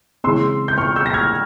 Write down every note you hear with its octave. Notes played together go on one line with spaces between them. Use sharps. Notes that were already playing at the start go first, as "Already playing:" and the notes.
C#3 E3 G#3 C4 C6 E6
G6
C#6 F6
E6 G6
A#6
F6 G#6